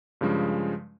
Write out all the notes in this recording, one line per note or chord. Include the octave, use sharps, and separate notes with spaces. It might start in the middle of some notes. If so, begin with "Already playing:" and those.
G2 C#3 F3 G#3